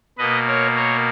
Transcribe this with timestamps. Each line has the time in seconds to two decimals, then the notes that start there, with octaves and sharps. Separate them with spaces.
0.18 B2 A#3 B4 D#5
0.47 A#4 C#5
0.76 A#4 C#5